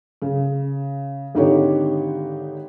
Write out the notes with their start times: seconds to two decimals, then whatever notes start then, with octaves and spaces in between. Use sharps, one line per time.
0.22 C#3
1.35 G#1 D3 D#4 G4 C#5